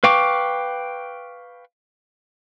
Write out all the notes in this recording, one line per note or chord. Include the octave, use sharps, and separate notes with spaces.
B4 F5 G5 C#6 D6